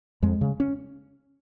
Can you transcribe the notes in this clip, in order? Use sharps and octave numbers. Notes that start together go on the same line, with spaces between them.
F2 G#3
C#3
C#4